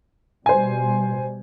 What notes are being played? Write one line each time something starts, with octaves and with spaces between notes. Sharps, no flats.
B2 G3 C5 G#5